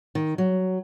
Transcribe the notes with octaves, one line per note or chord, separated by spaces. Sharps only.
D#3
F#3